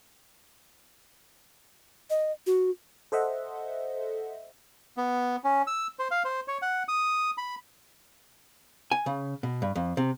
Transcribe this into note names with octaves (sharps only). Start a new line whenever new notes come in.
D#5
F#4
A4 C5 D#5 E5 F#5
B3
C#4
E6
C5
F5
C5
C#5
F#5
D#6
B5
G#5
C#3
B2
G2
F2
C3